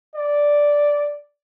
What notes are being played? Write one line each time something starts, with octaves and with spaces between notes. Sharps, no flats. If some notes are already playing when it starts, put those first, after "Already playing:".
D5